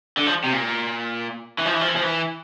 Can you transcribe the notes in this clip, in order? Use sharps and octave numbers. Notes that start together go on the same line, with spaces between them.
D3
F3
C3
A#2
E3
F3
E3
F3
E3
F3
E3